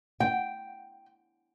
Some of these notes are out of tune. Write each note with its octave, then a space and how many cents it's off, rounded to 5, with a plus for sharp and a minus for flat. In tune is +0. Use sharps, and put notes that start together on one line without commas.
G5 -5